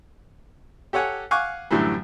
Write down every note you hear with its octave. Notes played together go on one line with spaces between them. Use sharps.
G4 A4 C#5 F#5 G#5
F5 F#5 G#5 C#6 D6 F#6
F#2 A2 D3 E3 F#3 G3